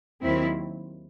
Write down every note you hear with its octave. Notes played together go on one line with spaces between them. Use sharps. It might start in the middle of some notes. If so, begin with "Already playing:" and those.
D#2 D#3 F#3 C4 E4